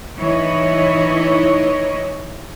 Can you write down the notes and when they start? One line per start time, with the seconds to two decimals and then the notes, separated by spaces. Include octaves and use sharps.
0.18 E3 D#4 E4 C#5 D#5